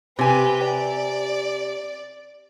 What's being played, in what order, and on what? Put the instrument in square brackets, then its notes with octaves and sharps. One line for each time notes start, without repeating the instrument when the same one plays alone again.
[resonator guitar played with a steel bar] C3 G#5 [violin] G4 B4
[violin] D5